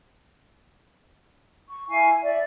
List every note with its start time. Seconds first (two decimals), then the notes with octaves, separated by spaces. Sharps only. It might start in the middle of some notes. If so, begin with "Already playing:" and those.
1.68 C#6
1.89 E4 F5 G#5 C#6
2.22 D5 E5